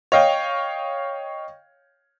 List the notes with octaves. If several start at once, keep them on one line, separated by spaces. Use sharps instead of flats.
C#5 D#5 F5 G5